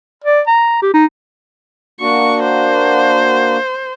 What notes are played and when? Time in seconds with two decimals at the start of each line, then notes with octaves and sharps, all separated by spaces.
0.24 D5
0.47 A#5
0.82 G4
0.94 D#4
2.01 A#3 D4 F#4 C#6
2.44 C5